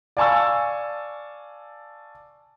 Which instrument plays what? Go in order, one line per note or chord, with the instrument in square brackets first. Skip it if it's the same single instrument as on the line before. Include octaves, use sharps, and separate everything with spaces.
[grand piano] D5 F5 G#5 A5 C#6 E6